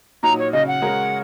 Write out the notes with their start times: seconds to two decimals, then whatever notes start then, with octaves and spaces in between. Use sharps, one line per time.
0.23 A#2 F#3 D#4 A#5
0.38 C#5
0.53 C#3 F#3 C#4 D#5
0.67 F#5
0.82 C#3 G#3 F#4 A#4 C#5